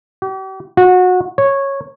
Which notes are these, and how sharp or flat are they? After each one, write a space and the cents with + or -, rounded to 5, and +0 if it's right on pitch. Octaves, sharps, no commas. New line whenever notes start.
G4 -40
F#4 -25
C#5 -10